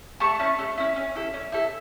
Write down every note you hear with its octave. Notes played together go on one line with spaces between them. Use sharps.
A3 A5 C#6
C#4 E4
A3
C#4 E4
C#4
E4 A4
C#4
E4 A4